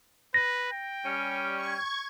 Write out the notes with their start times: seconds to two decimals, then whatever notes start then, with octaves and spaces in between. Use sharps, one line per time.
0.34 B4 A#6
0.72 G5
1.05 G3 C#4
1.56 C#6 G#6